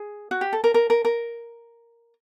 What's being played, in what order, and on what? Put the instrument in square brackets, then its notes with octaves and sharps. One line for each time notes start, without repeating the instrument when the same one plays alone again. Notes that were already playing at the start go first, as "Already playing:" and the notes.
Already playing: [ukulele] G#4
F#4
G4
A4
A#4
A#4
A#4
A#4